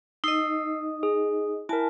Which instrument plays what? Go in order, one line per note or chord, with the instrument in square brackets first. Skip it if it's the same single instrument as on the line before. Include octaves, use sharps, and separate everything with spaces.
[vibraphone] D#4 D#5 [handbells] E6 C7
[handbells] G#4
[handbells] E4 A#4 [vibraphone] G#5 A5